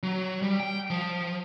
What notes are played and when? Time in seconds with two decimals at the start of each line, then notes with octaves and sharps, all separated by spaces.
0.03 F#3
0.42 G3
0.60 G5
0.90 F3